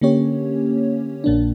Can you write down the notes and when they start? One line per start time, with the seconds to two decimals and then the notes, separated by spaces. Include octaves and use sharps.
0.01 D3 A#3 C#4 G4 C#5
1.24 A#1 A#2 A#3 D4